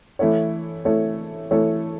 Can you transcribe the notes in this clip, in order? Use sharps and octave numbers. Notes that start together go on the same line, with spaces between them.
E3 A3 E4 A4 C#5
E3 A3 E4 A4 C#5
E3 A3 E4 A4 C#5